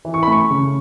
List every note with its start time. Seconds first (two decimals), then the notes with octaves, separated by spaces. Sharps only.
0.05 E3
0.14 C#6
0.23 B5
0.27 A3 C#6
0.50 C#3